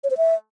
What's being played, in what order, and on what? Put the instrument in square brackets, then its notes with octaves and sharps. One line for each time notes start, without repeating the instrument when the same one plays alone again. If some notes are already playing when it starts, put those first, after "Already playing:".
[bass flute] C#5
C5
E5